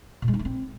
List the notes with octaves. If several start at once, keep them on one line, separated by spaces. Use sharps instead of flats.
A#2
G#3
D#4
A3
C4